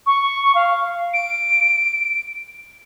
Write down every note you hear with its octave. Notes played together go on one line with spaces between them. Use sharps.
C#6
F5
D7